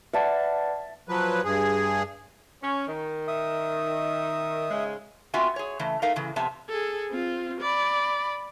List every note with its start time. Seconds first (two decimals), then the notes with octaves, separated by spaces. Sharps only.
0.14 B4 D5 E5 F#5 A5
1.09 F3 F#3 B4
1.44 G2 G#4
2.62 C#4
2.87 D#3
3.28 E5 D#6
4.69 G#2 C#3 G#3
5.34 B3 C4 F4 F#4 E5 G#5
5.56 G#4 C#5
5.79 C#3 E3 A3
6.02 A3 D#4 A#4 E5 F5
6.16 A2 C#3 E3
6.36 F2 C3 B3 E5 A5
6.69 G#4 A4
7.10 C4 F4
7.60 D5 B5